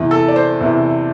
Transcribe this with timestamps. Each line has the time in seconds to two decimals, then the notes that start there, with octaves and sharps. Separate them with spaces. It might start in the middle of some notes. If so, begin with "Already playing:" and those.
Already playing: E2 C3 E3
0.11 A4
0.28 D5
0.36 C5
0.61 E2 C3 E3